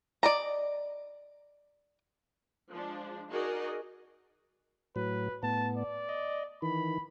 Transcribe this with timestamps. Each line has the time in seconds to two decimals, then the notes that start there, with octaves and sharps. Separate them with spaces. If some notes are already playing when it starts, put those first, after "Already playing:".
0.23 D5 D#5 A#5
2.70 F3 G#3 D4
3.29 D#4 F#4 G#4 A#4 D5 D#5
4.96 A2 F#3 B4
5.43 A2 B3 A5
5.77 D5
6.09 D#5
6.62 D#3 E3 B5